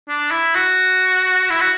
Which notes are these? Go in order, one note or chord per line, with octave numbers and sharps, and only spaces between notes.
D4
E4
F#4
E4
F#4